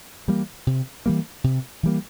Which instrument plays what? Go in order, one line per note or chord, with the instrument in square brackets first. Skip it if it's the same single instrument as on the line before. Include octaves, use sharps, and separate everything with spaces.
[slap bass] E3 G3 A#3
C3
E3 G3 A#3
C3
E3 G3 A#3